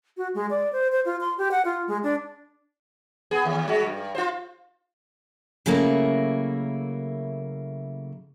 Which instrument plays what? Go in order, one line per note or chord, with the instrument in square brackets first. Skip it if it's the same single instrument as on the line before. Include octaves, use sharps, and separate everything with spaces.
[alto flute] F#4
G#3
D5
C5
C5
F4
C6
G4
F#5
F4
G#3
D4
[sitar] B3 G#4
D#2
G3 G#3 F#4
G2
F4 C5
[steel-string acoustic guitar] C#3 F#3 A3 A#3 E4 A#5